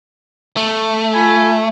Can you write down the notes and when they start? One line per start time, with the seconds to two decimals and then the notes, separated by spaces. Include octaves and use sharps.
0.57 A3
1.13 F4 G#5 B5